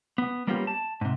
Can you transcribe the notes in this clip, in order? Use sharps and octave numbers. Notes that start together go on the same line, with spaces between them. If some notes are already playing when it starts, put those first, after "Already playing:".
B3
G3 A#3 B3 C#4 F4 G4
A5
G#2 C3